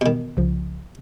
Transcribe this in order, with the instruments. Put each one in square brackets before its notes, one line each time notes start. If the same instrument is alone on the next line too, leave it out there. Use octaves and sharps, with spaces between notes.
[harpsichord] B2 D#3
[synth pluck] C2 C#3 F3